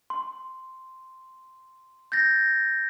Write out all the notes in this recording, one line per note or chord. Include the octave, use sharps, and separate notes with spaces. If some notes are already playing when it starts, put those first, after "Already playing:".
C6
G6 A6 A#6